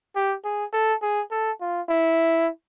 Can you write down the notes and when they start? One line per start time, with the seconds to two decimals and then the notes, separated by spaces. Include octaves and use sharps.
0.16 G4
0.45 G#4
0.73 A4
1.02 G#4
1.31 A4
1.61 F4
1.89 E4